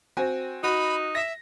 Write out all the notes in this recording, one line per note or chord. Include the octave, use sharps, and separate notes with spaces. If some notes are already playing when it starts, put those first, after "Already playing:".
C4 F#4 G#5
D#4 F#4 B5
E5 A#6